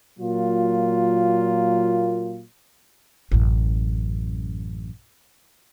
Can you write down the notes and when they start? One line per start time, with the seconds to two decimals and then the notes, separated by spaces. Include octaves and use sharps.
0.19 A#2 F#3 A#3 F4
3.32 A1 F#2